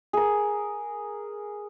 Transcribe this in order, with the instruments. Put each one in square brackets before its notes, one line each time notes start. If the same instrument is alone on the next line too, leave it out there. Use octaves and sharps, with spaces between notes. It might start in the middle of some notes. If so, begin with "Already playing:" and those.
[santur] G#4 A#4